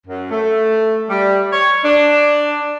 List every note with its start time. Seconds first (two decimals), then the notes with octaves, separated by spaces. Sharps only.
0.07 F#2
0.31 A3
1.10 G3
1.53 C#5
1.84 D4